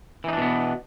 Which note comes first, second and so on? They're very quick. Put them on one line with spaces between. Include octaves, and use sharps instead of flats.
E3 D#4 D4 B2 B3